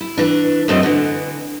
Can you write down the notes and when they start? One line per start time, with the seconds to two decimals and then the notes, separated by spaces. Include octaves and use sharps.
0.01 E4
0.17 E3 D4
0.68 F#2 A3 C4 D#5
0.83 D3 E3